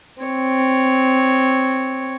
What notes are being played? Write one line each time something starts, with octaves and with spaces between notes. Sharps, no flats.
C4 C#5